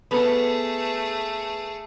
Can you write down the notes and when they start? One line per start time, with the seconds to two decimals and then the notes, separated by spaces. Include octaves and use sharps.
0.11 A3 B3 G#4 A4 B4